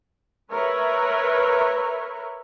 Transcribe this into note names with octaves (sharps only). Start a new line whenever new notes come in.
A#4 B4 C#5 E5